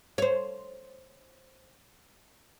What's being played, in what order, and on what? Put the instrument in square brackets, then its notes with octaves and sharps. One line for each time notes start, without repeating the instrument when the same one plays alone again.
[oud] C5 C#5